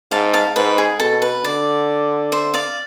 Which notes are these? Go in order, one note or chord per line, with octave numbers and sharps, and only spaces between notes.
G#2 F5 A5
F5 A5
G#2 B4
G#4
B2 A4
B4
D3 D5
C5 E5
D5 F5